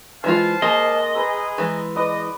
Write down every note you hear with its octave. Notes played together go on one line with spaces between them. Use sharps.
E3 G#3 F4 C5 F5 A5
G#3 A#3 D#5
G#4 B4 A#5 E6
E3 G#3
B4 D5 D#5